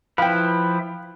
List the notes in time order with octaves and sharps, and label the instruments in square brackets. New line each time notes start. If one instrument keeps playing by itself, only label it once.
[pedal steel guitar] F3 E4 B4 [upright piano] F5 G5